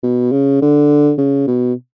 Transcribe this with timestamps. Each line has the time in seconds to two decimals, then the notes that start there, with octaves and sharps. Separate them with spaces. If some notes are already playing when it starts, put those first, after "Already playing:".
0.03 B2
0.32 C#3
0.61 D3
1.18 C#3
1.47 B2